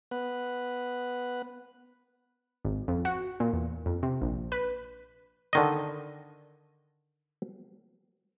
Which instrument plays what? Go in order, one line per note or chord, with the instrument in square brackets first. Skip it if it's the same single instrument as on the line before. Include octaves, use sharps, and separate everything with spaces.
[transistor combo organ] B3 B4 F#5
[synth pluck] G#1
F2
F#4
A#2
E2
F2
C3
A#1
B4
[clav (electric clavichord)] D3 D#3 D#5